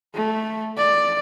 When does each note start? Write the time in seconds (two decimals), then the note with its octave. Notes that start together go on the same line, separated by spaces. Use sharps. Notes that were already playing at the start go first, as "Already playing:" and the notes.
0.15 A3
0.78 D5